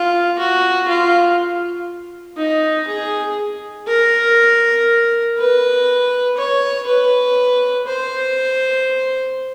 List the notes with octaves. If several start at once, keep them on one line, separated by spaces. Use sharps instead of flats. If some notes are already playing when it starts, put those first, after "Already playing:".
Already playing: F4
F#4
F4
D#4
G#4
A#4
B4
C#5
B4
C5